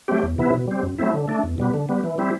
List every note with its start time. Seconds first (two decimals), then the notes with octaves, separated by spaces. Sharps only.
0.08 F#3 A3 C4 G4
0.23 E2
0.38 C3 E3 B3 E4
0.54 B2
0.68 G3 C4
0.83 F#2
0.98 F#3 A3 C4 E4
1.14 D3
1.28 A3 D4
1.43 E2
1.58 B2 G3 B3
1.74 D3
1.89 G3 B3
2.03 E3
2.18 G3 C4 E4